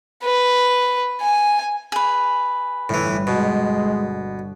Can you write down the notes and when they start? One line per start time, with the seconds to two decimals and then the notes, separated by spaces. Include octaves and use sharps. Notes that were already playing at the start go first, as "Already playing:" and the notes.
0.23 B4
1.21 G#5
1.92 G#4 B4
2.89 G1 A2 E3
3.27 B2 G#3